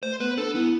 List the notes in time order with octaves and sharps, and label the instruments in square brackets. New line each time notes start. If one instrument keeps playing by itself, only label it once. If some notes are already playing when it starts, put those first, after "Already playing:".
[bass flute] A3 [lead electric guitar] C5
[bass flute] B3 [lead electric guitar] B4
[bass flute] D4 [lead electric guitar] A4
[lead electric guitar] B3 [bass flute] E4